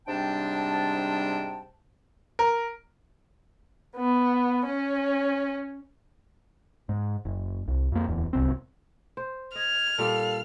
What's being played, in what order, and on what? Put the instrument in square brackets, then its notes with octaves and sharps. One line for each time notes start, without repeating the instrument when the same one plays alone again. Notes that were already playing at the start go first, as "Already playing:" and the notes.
[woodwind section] G#2 C3 G3 D4 G5 A5
[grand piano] A#4
[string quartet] B3
C#4
[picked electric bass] G#2
F#1
C2
F2 A#3
D1 E2
D1 C2 C4
[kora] C5
[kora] D#5 [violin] F6 [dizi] G#6
[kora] A#2 G3 D4 [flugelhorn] A4 [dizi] F5